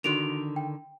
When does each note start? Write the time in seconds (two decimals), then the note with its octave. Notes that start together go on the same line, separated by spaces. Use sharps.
0.04 D3 D#3 D4 F#4 D7 F7
0.56 G5